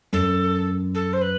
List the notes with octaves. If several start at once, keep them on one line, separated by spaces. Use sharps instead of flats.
F#2 A4
A4
C5
B4